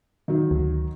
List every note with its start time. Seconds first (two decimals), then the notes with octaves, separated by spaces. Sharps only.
0.28 D#3 F#3 D#4
0.51 D2